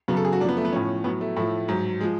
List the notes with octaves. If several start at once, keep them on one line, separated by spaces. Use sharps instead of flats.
F#2 C#3 F#3 B3
A4
G#4
F#4
F#2 F3 B3 D4
A3
B3
A2 F3 C#4
A2 F#3 B3
A3
A2 F3 A3
G#2 F#3
F3 G#3